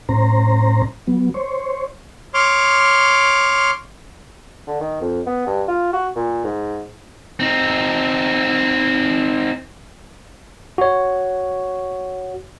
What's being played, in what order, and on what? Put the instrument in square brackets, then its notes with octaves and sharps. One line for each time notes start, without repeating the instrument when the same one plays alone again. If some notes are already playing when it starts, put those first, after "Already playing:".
[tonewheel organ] A2 C#4 C5 A#5
F#3 B3
C5 C#5
[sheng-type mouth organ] C#5 C6 D6 F6
[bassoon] D3
D#3
F2
B3
G2
F4
F#4
A#2
G#2
[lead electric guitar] C4 D#4
[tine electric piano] F#4 C#5